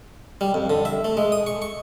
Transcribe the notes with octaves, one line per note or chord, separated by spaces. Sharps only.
G3
F2
D3
E5
A3
G#3
D#6
C#6
C#6